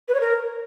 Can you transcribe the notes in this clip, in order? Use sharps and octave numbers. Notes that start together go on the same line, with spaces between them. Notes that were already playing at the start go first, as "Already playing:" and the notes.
B4
C#5
A#4